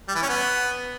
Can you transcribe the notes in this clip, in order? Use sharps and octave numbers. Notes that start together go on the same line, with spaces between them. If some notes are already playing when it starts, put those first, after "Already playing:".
G3
E3
C#4
B3